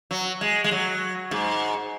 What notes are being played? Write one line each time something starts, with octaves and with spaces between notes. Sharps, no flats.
F#3
G#3
G#3
F#3
G#2